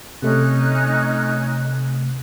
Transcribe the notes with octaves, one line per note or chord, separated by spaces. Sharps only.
C3 A3 C#4 D#4 F#6